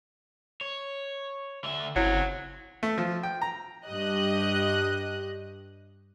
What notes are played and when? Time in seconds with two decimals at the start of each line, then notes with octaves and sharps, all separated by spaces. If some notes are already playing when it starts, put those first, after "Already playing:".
0.61 C#5
1.64 D3 E5
1.96 G1 C#3 F#3 C4 E4 C#5
2.83 A3
2.98 F3
3.23 G5
3.42 A#5
3.86 G2 G4 D#5 F#6